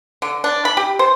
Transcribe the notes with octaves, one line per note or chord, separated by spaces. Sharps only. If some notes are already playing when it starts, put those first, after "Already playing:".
D3
D4
B5
G4
C5